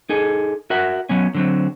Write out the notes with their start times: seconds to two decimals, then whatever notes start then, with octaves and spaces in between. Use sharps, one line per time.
0.09 D#4 G#4 A4
0.70 F#4 A#4 E5 F#5
1.09 F#3 B3 C#4
1.35 D3 F#3 C4